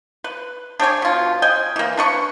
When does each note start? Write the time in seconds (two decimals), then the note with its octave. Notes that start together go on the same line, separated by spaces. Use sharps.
0.24 B4
0.80 D4 G4 C#5 G#5
1.02 B2 F4
1.42 D#5 G5 G#5
1.76 E3 A#3
1.97 D4 B4 C#6